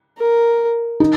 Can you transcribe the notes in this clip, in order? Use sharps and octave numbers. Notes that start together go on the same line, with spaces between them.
A#4
D#4